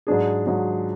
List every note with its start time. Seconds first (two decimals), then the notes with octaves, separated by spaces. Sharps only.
0.07 G#2 F#3 D4 G#4
0.46 G#2 F#3 D4 G#4